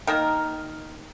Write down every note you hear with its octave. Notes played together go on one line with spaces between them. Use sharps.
D#3 A#3 A#4